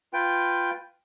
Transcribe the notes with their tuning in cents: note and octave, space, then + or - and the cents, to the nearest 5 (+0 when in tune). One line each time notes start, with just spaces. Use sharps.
F4 +0 B4 +5 G5 +0